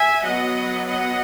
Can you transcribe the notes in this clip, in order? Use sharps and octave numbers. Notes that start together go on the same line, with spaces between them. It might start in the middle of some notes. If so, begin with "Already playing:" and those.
Already playing: E5 G#5
F#3 B3 D#5 F#5
D#5 F#5